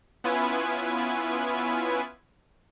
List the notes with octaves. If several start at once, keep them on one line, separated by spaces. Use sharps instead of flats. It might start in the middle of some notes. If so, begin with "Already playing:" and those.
B3 C#4 E4 F4 B4 G#5